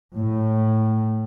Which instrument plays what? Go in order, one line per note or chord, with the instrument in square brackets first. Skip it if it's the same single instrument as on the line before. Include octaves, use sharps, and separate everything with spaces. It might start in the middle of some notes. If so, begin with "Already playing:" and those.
[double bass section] A2